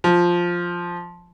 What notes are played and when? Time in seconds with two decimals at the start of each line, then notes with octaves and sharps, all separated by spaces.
0.04 F3